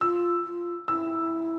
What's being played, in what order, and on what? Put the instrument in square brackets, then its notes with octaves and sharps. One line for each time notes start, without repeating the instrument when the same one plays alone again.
[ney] F4 [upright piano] E6
[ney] F4
[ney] E4 [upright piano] E6